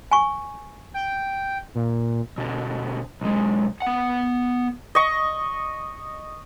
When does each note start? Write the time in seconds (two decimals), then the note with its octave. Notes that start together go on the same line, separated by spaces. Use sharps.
0.11 G#5 C#6
0.94 G5
1.75 A#2
2.38 B2 D3
3.21 B1 G#3
3.82 B3 F#5
4.95 D#5 C#6